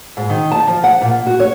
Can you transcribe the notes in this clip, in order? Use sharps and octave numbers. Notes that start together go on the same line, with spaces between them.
G#2
D#3
A5
F3
F#5
A#2
F#4
C#5